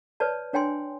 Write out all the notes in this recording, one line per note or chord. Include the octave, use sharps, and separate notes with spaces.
B4 C#5 D5 A5
D4 C#5 G5 G#5 C6